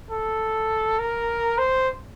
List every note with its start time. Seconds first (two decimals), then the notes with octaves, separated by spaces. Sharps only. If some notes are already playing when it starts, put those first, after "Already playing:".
0.10 A4
0.99 A#4
1.58 C5